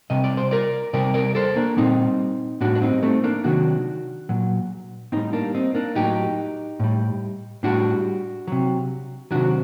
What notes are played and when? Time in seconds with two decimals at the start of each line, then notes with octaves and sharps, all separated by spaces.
0.10 C3 G3 D#5
0.24 D5
0.37 C5
0.51 A#4 D5
0.93 C3 G3 A#4 D5
1.14 A#4 D5
1.35 A4 C5
1.56 A#3 D4
1.77 A#2 G3 C4 D#4
2.61 A2 G3 D4 F#4
2.76 D4
2.82 C4 D#4
3.03 A3 C4
3.24 A#3 D4
3.44 C3 D#3 F#3 D4 F#4
4.29 A#2 F#3
5.12 A2 G3 C4 D#4
5.33 A#3 D4
5.55 C4 D#4
5.75 A#3 D4
5.95 A2 F#3 D#4 G4
6.80 A2 G3
7.63 A2 G3 D4 F#4
8.47 C3 F#3
9.31 C3 D#3 F#3 D4 F#4